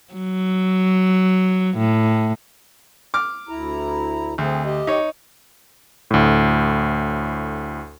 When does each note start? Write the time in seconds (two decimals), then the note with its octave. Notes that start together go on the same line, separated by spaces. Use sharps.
0.14 F#3
1.78 A2
3.14 D6 F6
3.49 D2 E4 A#5
4.38 D2 C4 G#4
4.65 G4 D#5
4.87 D#4 C#5
6.11 D2 A2